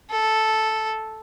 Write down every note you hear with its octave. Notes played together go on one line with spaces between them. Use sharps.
A4